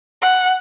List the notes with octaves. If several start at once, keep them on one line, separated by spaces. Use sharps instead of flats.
F#5